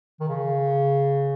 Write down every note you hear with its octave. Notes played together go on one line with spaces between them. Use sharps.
D#3
C#3